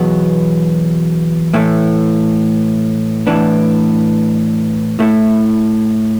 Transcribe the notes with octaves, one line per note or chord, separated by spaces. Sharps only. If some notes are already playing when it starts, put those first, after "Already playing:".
Already playing: E2 B2 F#3 B3
A2 E3 A3
A2 E3 B3 D4
A2 A3 E4